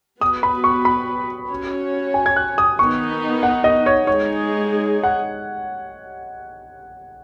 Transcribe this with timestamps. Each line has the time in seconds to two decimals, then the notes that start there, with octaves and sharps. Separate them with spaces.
0.21 B3 F#4 B4 D#6
0.43 B5
0.64 C#6
0.85 B5
1.50 C#4 F#4 C#5
2.14 G#5
2.26 G#6
2.36 F#6
2.58 D#6
2.79 D#3 B3 D#4 C#6
3.43 F#5
3.64 D#5
3.86 C#5
4.07 G#3 D#4 G#4 C#5
5.04 F#5